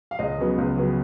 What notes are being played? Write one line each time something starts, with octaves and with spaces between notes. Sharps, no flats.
F5
C#2 D#5
C#3 F#3 B3
C#2
C#3 F#3 B3